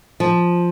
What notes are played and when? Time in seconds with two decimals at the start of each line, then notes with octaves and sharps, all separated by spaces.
0.20 F3